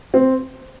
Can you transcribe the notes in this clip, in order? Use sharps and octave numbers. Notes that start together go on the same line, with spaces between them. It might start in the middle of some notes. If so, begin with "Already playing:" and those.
C4